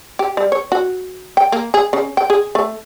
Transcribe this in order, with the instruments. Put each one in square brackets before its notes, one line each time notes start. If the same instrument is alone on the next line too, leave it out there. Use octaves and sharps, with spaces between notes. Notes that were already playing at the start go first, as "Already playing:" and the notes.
[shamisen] G4
G3
C#5
F#4
G5
A#3
G#4
C#3
G5
G#4
A3